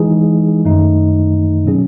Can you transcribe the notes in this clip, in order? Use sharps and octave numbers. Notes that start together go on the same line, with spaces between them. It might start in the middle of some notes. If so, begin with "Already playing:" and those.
Already playing: E3 G#3 D#4 G#4
F#2 D#3 A3 D#4
B2 F#3 C#4 G#4